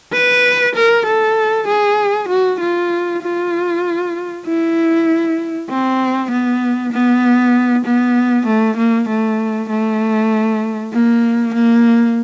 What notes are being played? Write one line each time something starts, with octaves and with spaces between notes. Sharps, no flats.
B4
A#4
A4
G#4
F#4
F4
F4
E4
C4
B3
B3
B3
A3
A#3
A3
A3
A#3
A#3